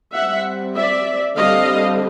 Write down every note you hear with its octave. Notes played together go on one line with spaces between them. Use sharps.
G3 C4 E5 F#5
D5 E5
D3 G3 C4 D#5 F5